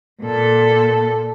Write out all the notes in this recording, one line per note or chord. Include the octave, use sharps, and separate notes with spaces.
A#2 A4